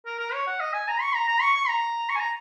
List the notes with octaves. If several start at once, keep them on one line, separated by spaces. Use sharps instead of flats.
A#4
A#4
C#5
F#5
D#5
G#5
A#5
C#6
A#5
A#5
C#6
C#6
A#5
C#6
G#5
A#5